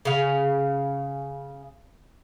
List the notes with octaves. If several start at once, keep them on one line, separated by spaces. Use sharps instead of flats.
C#3 F5